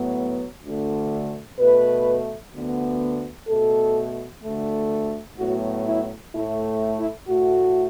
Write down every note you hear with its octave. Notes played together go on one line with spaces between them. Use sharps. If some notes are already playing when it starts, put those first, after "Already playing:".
Already playing: A2 F#3 B3
D2 D3 A3
B2 A3 B4
D2 D3 B3
B2 A3 A4
D2 D3 A3
A2 F#3 B3 F#4
E4
A2 A3 E4
E4
A2 A3 F#4